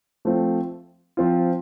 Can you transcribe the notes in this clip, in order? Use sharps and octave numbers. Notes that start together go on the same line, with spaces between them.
F3 A3 C4 F4
F3 C4 F4